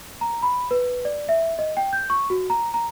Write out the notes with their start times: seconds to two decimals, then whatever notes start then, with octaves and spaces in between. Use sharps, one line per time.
0.21 A#5
0.43 B5
0.71 B4
1.05 D5
1.29 E5
1.59 D#5
1.77 G5
1.93 G6
2.10 C#6
2.30 F#4
2.50 A#5
2.74 A#5